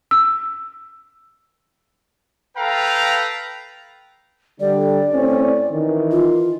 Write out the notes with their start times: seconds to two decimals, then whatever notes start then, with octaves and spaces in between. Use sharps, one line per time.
0.11 E6
2.57 A4 B4 F5 G5 A#5
4.60 D3 G3 D5
5.12 A2 C4 C#4
5.71 D#3 E3
6.11 F4